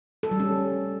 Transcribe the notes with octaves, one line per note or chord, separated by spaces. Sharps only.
A4
G3
C#4